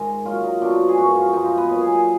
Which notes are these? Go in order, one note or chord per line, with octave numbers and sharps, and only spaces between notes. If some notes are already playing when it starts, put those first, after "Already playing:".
Already playing: G#2 D#3 G#3 A#4
A#2 F#3 F4
D#4
B2 F#3 D4
D#4
G#4
F#2 F3 G#3 F#4
F4
F#2 F3 G#3 D#4
D#4
B3
A#2 F#3
G#4
G#4